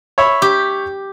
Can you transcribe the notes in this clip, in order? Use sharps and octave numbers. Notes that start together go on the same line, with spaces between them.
C#5 E5 B5
G4